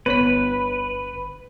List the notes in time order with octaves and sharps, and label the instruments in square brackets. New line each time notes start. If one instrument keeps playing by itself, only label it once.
[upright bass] G1 [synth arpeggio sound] B3 C#5 B6 [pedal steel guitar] B4